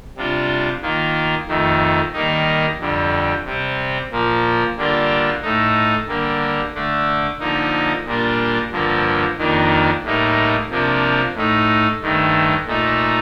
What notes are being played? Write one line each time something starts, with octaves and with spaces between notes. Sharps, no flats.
C3 G3 D4 F4
D#3 A#3 F4
F2 D#3 A3
D#3 G3 A#3 D#4
F2 D3 G3
C3 G3 C4
A#2 F3 A#3
D3 G3 A#3 D4 F4
A2 A3 D#4
D3 G3 A#3
D3 A3 D4
D3 F3 A#3 D#4
A#2 G3 A#3 D4 F4
G2 D3 F3 A#3
F2 D#3 A#3 D4
A2 G3 A#3 D#4
C3 F3 A#3 D4
A2 A3 D#4
G2 D#3 A3
A#2 A3 D#4